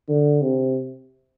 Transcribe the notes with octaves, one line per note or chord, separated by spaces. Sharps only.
D3
C3